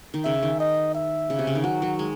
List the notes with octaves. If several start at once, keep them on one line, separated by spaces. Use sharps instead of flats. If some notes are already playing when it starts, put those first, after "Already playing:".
D#3
C#3 E5
D#3
D#5
E5
C#3
C3
C#3
D#3
F#3 F#5
F#3
G#3